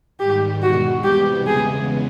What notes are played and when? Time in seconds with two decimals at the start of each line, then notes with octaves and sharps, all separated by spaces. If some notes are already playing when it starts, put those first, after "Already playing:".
0.19 G#2 D#3 G3 G4
0.62 E2 B2 G#3 F#4
1.04 C3 E3 G3 B3 G4
1.47 E2 C#3 E3 G#3 B3 G#4